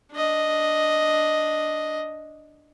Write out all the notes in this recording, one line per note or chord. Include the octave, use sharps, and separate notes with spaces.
D4 D#5